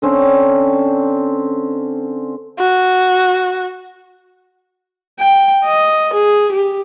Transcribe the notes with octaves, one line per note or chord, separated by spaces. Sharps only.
D3 C4 C#4
F#4
G5
D#5
G#4
G4